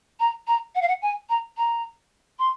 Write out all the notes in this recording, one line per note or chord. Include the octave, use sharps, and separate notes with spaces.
A#5
A#5
F#5
F5
F#5
G#5
A#5
A#5
C6